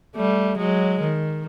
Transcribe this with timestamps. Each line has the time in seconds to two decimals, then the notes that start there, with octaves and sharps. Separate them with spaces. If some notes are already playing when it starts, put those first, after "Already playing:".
0.16 G3 A3
0.57 F#3 G#3
1.01 D#3